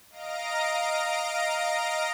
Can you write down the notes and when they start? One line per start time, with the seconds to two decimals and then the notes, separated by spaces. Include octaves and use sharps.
0.10 D#5 F5 A#5 A#6 D7